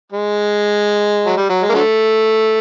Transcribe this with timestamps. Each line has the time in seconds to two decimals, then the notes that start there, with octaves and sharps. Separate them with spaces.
0.12 G#3
1.26 F#3
1.37 G3
1.49 F#3
1.62 G#3
1.69 A#3
1.74 D3 F#3 A3